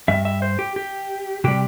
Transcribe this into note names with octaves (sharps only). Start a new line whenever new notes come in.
G2 G3 E5
E5
C5
G4
G4
C3 G3 G4